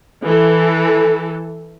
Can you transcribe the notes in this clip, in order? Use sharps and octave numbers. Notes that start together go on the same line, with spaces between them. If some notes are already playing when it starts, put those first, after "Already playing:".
E3 A4